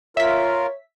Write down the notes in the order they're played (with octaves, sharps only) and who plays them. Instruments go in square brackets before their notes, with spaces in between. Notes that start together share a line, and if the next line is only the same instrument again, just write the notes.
[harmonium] F4 A#4 [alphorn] C#5 [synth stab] E5 B6